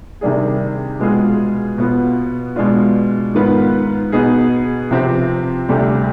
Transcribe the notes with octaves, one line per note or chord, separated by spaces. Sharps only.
C3 D#3 G3 D4 G#4
B2 G#3 B3 F4 G#4
B2 B3 F4
B2 G#3 D4 F4
G#2 D#3 B3 F4 B4
B2 B3 D#4 G#4
C3 F3 C4 G4
D2 C3 G3 D4 G4